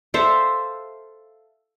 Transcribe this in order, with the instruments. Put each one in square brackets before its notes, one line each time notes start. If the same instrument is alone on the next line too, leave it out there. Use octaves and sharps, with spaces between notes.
[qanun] A4 C5 E5 F5